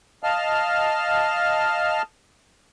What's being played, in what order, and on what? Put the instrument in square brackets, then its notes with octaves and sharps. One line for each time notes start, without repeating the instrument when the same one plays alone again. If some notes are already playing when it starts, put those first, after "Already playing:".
[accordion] D#5 F5 A5 F6